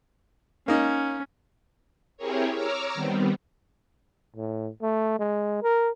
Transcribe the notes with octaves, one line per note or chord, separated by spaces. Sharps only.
A#3 C#4 D#4
C4 E4 G4 G#4 A#4 C#5
C#5 A#5 D6 E6 F6
D#3 G3 B3 C4
A2
A3
G#3
A#4